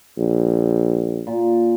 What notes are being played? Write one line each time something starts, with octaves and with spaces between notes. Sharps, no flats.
A#1
A#2